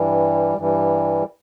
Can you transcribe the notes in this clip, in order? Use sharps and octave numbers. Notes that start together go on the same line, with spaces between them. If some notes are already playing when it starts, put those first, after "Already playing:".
Already playing: G2 E3 G3
G2 E3 G3